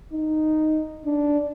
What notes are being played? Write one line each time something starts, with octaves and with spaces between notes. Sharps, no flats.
D#4
D4